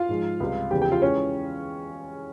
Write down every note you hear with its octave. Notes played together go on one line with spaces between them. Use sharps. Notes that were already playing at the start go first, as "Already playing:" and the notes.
Already playing: F4 F5
G#2 F3 G#3
C#2 C3 G3
E2 C#3 F3 G4 G5
G4 G5
F4 F5
E3 G#3 C#4 C#5